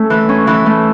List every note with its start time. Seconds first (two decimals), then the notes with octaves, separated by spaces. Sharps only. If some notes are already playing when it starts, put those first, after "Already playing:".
Already playing: A3 C#4
0.10 E3
0.29 C#4
0.47 E3
0.66 A3